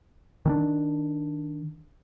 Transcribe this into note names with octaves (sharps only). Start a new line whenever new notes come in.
D#3 C#4 D4